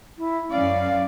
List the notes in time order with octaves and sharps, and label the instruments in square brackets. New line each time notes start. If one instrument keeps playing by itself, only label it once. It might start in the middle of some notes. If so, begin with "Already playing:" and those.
[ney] E4
[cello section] F#2 C#4 D5 [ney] F5